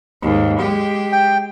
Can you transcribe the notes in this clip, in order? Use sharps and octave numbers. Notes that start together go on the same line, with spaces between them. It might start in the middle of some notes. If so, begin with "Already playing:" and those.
D#2 G#2
G#3 G4
G5